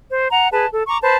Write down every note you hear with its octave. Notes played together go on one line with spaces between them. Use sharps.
C5
F#5 A#5
G#4 B4 A5
A4
A#5 C#6 D6
B4 C5 A5